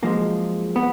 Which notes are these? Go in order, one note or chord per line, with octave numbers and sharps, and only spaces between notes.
F#2 F3 G#3 A#3
B3